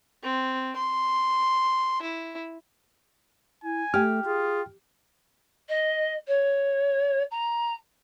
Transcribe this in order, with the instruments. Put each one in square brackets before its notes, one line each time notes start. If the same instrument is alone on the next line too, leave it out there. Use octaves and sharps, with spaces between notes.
[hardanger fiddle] C4
C6
E4
[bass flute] E4 [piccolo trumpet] G#5
[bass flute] A3 [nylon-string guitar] G4 [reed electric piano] G5 F6
[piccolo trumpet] F4 [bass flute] G#4
[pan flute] D#5
C#5
A#5